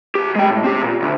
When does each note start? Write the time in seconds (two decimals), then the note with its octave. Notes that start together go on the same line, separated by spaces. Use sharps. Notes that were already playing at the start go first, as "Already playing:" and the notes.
0.15 C2 G4
0.36 G#3 G5
0.51 A2
0.64 C4 G4
0.82 A#2
1.02 D2